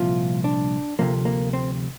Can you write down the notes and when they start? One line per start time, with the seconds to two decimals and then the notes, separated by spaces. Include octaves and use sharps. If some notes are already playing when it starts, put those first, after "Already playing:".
Already playing: C2 A#2 F3 F4
0.44 D4
0.99 D2 C3 F3 A#3
1.25 A#3
1.53 C4